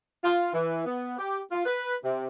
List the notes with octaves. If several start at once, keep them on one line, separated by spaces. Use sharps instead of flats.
F4
E3
B3
G4
F4
B4
C3